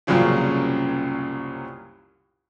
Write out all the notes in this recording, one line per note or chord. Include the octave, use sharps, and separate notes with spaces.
C2 F#2 A#2 C#3 F3